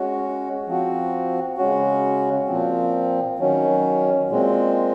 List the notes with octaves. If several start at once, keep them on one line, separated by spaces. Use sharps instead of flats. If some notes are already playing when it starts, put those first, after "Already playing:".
Already playing: G#3 C#4 F#4
F3 C4 F#4
C#3 G#3 C#4 F#4
A#2 F3 C4
D#3 F#3 C#4
A#2 G#3 C4